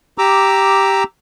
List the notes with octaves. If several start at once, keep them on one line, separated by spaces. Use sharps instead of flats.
G4 A#5 D6 E6